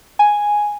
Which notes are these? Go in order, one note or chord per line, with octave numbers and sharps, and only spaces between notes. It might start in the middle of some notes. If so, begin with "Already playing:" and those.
G#5